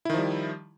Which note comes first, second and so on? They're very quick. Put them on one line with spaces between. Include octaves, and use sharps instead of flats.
E4 D#3 F3 G3